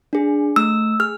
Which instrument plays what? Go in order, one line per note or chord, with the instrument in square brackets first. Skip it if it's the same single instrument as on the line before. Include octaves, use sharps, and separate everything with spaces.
[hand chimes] D4 G#4
A3 E6
G#4 F6